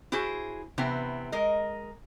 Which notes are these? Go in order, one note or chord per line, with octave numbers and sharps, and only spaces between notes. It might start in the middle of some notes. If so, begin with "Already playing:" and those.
E4 F#4 G#4 C5
C3 E3 B3 C4
G#3 A#4 D#5